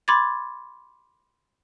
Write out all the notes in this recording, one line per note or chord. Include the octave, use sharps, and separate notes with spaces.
B5 C6 D6 G#6 A6